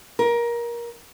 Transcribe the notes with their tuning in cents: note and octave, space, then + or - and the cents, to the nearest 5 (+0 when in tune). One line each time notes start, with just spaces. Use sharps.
A#4 +20